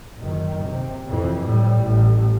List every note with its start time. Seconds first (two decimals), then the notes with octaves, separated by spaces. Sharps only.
0.17 F#1 D#3
0.63 C3
1.08 F2 E3
1.44 A2 G3
1.82 A1